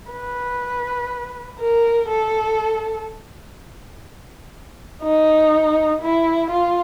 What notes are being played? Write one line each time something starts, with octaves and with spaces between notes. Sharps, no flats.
B4
A#4
A4
D#4
E4
F4